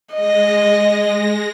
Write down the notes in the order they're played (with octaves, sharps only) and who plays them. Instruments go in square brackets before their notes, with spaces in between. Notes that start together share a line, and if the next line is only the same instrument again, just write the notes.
[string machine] G#3 A#6 [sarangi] D#5